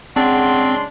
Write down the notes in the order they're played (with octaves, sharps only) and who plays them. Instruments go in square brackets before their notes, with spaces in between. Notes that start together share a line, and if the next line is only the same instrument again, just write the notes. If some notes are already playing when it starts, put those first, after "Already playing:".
[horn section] C#3 G#3 C6 [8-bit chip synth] C4 [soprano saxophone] D4 [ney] F#5